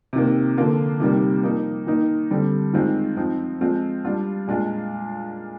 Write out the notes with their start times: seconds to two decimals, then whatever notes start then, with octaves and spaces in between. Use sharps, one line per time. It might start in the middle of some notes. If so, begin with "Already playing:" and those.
0.13 C3 D#3 A#3
0.57 D3 F3 A#3 F4
1.00 C3 D#3 G3 A#3
1.43 F3 A#3 D#4
1.87 D#3 A#3 D#4
2.31 D3 G3 C4
2.73 D#3 G#3 C4 F4
3.17 F3 C4 D#4
3.61 F3 G#3 C4 F4
4.05 G3 D4 F4
4.47 A#2 G#3 D4 F4